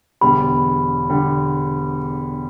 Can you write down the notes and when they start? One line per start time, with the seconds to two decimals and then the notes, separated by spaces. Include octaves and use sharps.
0.21 E1 E2 D3 G3 B5
1.10 D3 G3